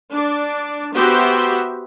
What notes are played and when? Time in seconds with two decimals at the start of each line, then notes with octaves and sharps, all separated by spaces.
0.14 D4 D5
0.95 B3 F#4 G4 C5 E5